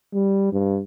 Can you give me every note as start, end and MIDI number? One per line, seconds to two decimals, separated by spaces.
0.13 0.52 55
0.52 0.80 43